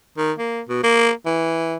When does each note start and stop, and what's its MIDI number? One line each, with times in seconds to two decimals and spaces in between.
0.17 0.32 51
0.39 0.61 58
0.69 0.80 47
0.83 1.10 58
1.26 1.77 52